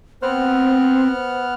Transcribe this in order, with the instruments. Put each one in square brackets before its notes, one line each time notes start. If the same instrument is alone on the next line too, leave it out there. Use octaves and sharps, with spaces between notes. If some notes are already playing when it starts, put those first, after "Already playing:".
[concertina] B3 F#5 F6 [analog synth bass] C4 [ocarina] C5